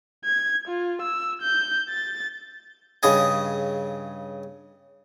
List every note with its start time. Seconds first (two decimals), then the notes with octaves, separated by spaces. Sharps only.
0.25 G#6
0.68 F4
1.02 E6
1.42 G6
1.90 A6
3.03 G2 C#3 G#4 D#5 G#5